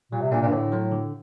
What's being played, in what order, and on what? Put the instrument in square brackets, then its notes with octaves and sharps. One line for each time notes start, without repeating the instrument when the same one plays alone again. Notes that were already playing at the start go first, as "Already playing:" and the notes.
[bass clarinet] A#2 [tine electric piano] G3
[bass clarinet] C3
[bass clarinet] A#2 [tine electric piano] A#3 D4
[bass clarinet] A#2
G2
[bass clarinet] A2 [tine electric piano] D3
[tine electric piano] F#3 A3
D3